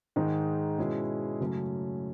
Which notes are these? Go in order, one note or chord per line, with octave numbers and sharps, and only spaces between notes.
G#2 D#3 G#3 D#4
B2 G#3 C#4 E4 G#4
F#2 C#3 F#3 A3 C#4